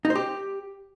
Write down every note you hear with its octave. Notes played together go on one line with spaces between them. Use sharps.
D#4
C5
G4